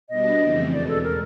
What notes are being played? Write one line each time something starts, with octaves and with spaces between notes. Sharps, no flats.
B2 G3 B3 D4 D#5
F2 C#3 E3 A3 C4
E2 B2 G#3 D5
A4
A#4